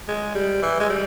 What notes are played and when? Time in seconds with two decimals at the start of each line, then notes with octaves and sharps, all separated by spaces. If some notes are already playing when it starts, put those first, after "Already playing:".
0.08 G#3
0.35 G3
0.63 E3
0.80 G#3
0.90 G3